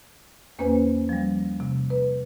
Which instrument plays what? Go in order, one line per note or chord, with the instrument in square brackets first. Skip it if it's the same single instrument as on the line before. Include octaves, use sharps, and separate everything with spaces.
[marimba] E2 A#3 C#4 B4 C5 G#5
F3 G3
C3
B4